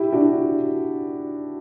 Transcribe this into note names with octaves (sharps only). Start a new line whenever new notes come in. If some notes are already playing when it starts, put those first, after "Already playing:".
Already playing: E4 G4
D4 F#4